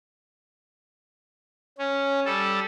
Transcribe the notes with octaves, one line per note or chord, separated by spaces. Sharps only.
C#4
G3 A4